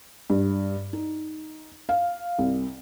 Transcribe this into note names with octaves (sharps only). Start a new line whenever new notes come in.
G2
D#4
F5
C2